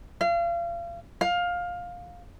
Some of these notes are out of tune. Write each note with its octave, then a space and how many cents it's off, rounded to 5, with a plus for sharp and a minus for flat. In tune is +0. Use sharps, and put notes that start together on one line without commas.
F5 -35
F5 +15